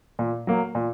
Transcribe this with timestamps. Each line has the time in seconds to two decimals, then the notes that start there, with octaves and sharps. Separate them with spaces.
0.19 A#2
0.47 F#3 A#3
0.75 A#2